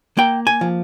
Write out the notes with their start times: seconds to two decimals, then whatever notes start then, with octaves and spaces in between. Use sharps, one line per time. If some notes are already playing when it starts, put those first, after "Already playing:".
0.17 A#3 G5
0.47 G#5
0.61 F3